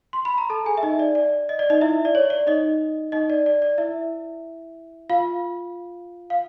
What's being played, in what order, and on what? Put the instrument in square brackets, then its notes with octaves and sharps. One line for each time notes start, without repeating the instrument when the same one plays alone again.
[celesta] C6
B5
A#5
A4 A5
G#4 G#5
E5
D#4 D#5
D5
D5
D#5
D5
D#4 D#5
E4 E5
D5
C#5
D5
D#4 D#5
D#4 D#5
D5
D5
D5
E4 E5
F4 F5
F5